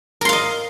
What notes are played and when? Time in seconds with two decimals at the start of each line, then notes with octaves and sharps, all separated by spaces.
0.21 A#4
0.25 C6
0.29 F5
0.33 D#5